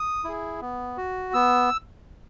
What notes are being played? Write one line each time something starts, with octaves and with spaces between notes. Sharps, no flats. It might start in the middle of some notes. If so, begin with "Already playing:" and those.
Already playing: D#6
E4 G#4
B3
F#4
B3 E6